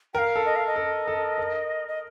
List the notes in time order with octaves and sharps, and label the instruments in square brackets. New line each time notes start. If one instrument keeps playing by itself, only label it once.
[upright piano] A#4 [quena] F5 G5
[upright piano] A4
[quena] D#5
F5
D#5
[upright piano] A4
A4
A#4
[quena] D#5